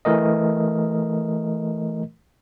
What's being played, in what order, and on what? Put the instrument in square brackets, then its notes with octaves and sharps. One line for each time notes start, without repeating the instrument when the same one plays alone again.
[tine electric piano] E3 A3 A#4 D#5